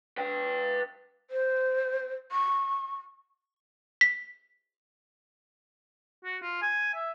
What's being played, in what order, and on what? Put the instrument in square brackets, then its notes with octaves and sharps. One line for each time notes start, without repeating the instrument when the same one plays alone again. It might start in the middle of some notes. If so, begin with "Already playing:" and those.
[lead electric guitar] B4 G5
[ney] C5
C#6
[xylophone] B6
[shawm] F#4
F4
G#5
E5